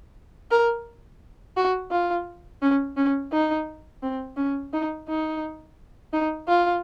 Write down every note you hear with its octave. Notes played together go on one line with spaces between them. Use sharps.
A#4
F#4
F4
C#4
C#4
D#4
C4
C#4
D#4
D#4
D#4
F4